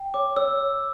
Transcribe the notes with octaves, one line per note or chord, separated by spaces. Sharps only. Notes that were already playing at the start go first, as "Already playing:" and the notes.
Already playing: G5
C#5 D6
C#5 E6